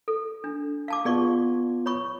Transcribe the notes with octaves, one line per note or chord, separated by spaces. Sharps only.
A4
D4
F5 A5 D6
B3 F4 G#4 D5 C#6
C#5 B5 C#6